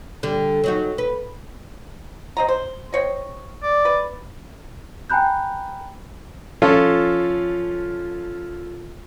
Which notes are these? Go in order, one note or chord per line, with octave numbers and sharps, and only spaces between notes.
D3 G3
F#3 D#4 F#4
B4
C4 D#5 A#5
C5
C4 C#5 D#5
D5
B4
G5 G#5 A#5 B5 F#6 G6
F3 C#4 F4 A4